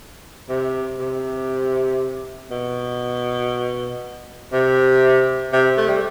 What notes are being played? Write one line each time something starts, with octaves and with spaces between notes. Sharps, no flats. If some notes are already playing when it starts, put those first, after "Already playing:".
C3
C3
B2
C3
C3
A3
G3